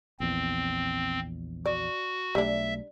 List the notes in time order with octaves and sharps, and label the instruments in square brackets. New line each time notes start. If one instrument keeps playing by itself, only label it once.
[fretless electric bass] A#1 E2 [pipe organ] C4
[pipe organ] F#4 [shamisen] D5
[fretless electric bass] B1 A3 [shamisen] G3 D4 [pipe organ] E5